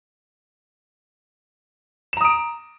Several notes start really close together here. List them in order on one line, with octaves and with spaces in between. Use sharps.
E7 A#5 D#6 D7